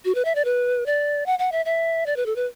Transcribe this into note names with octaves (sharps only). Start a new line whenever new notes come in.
F#4
B4
E5
D5
B4
D5
F#5
F#5
E5
E5
D5
B4
A4
B4